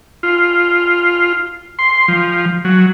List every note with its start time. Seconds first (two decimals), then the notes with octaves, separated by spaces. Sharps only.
0.23 F4
1.79 C6
2.08 F3
2.65 F#3